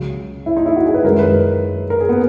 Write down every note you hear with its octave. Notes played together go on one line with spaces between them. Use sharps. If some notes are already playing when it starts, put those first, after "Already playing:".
Already playing: C#2 C#3 F#3
E4
D#4
E4
F#4
G#4
B4
F#2 D#3 G#3 A#4
B4
A#4
G#4
B3